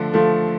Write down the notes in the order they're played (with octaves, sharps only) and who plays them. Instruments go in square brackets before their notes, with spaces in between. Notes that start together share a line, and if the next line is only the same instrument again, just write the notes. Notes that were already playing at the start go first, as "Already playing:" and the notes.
Already playing: [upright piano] D3 F3 A3
F3 A3